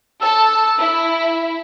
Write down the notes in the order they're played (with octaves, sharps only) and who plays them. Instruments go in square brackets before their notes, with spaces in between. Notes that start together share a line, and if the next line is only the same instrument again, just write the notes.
[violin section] A4 A5 [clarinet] E6
[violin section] E4